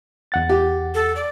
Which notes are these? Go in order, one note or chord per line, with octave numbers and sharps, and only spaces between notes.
E2 F#5 A6
G4
A4
D5